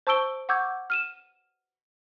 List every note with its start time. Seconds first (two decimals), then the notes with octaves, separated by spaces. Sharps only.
0.07 C5 A5 C#6 E6 D7 G7
0.49 F#5 C#6 D6 E6 G6 G#6
0.90 F6 D#7 E7